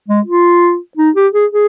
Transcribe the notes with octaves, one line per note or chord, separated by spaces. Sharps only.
G#3
F4
D#4
G4
G#4
G#4